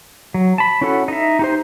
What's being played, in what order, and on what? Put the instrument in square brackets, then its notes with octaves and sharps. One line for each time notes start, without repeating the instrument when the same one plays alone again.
[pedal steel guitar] F#3
A5 B5
C#4 E4 F#4 A4 F#5
D#4 E5
D#4 G4 C5